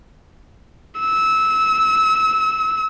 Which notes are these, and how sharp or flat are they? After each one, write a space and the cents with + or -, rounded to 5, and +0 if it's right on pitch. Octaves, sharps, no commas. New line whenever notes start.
E6 -20